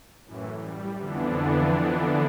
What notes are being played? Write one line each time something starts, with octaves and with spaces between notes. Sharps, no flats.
F#2 A2 E3
G3
F2 D3 E3 B3 D4